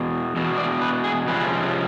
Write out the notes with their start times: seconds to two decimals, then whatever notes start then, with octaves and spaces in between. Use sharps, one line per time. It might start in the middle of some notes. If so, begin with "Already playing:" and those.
Already playing: E2 B2
0.36 E2 B2
0.58 D5
0.81 B4
1.04 G#4
1.28 C3 F3 G#3 C#4 F4 B4